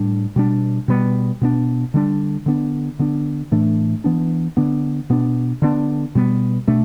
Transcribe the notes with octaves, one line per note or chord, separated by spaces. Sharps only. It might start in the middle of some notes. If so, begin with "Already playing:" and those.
Already playing: A2 G3 D4
B2 G3 D4
B2 G3 B3
B2 B3 D4
D3 G3 D4
D3 B3 D4
D3 B3 D4
A2 E3 A3 D4
E3 B3 D4
D3 B3 D4
B2 B3 D4
D3 B3 D4
B2 G3 B3
B2 A3 D4